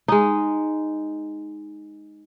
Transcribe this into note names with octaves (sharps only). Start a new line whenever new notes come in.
G#3 D#4